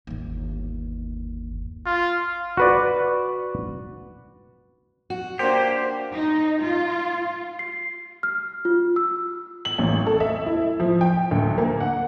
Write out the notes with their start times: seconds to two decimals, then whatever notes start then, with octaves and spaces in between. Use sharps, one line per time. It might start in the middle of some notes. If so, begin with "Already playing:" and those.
0.07 G1 D#2
1.86 F4
2.57 F#4 B4 D5
5.10 F#4
5.39 A#3 D4 G4 C5 G5 B6
6.14 D#4
6.61 F4
7.59 C7
8.23 F6
8.65 F4
8.96 E6
9.65 F#7
9.79 A1
10.07 A4
10.20 E5
10.46 E4
10.80 F3
11.01 G5
11.31 D2
11.58 A#3
11.80 F#5